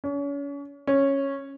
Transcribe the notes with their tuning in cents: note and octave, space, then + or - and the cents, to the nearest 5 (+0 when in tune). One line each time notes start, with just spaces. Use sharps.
C#4 +35
C#4 -10